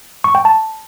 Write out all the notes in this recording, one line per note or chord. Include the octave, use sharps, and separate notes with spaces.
C#6
G5
A5